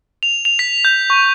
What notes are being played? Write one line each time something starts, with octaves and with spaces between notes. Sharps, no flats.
F7
F7
B6
G6
C#6